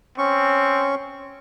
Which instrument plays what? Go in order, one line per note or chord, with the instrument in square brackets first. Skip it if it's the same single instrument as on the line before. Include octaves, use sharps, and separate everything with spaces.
[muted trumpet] C4 [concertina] C#4 C#6